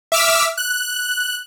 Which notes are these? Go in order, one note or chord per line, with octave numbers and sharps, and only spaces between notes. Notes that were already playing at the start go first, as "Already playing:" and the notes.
E5 D6 E6 F6 B6
F#6